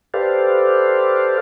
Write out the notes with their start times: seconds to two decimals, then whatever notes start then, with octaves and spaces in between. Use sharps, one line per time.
0.14 G4 A4 B4 C5 D5 F5